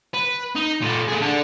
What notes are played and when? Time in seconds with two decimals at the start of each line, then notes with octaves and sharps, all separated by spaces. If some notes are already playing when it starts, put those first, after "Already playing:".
0.14 B4
0.55 D#4
0.81 A#2 A4
1.08 A3 G#4
1.21 D4 A4